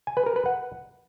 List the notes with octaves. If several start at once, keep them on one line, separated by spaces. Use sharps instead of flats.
G#5
B4
A#4
B4
F#5